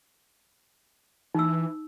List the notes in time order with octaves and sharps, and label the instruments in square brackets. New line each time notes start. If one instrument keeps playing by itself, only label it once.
[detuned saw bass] E3 [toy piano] D#4 E6